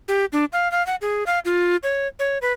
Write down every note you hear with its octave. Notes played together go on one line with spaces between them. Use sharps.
G4
D4
F5
F5
F#5
G#4
F5
F4
C#5
C#5
B4